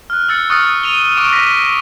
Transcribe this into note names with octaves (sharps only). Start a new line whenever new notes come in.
F6 F#6
E6 A6 C#7
C#6 D#6 F6 F#6 A6 C#7
D#7 F7 G7
C#6 D6 D7 E7
A#6 B6